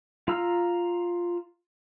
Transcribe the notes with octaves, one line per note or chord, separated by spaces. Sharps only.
F4 F5 A#5 E6 F6